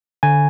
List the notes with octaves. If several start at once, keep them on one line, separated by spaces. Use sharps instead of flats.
D3 G#5